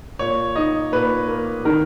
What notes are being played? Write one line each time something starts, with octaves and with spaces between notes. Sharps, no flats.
A#2 C#5
D#4 D#5
A#2 B4
A#3
D#3 A#4